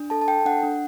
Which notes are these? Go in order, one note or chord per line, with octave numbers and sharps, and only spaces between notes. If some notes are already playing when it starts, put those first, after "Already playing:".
Already playing: D4
A4 A5
A5
A4 G5
D4 F#5
D4